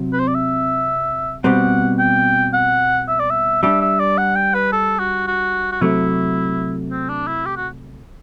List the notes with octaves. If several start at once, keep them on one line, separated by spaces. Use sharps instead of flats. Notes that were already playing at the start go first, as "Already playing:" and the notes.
Already playing: C3 F#3 C4
B4
C5
D5
E5
B2 G3 C4 G4 F#5
G5
F#5
E5
D5
E5
G3 D4 G4 E5
E5
D5
F#5
G5
B4
A4
F#4
F#4
F#4
C3 F#3 A3 E4
C4
D4
E4
G4
F#4